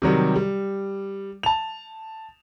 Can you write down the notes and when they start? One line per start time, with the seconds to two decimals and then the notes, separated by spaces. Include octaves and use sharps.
0.02 C3 D#3 F#3 G3
0.36 G3
1.43 A5 F7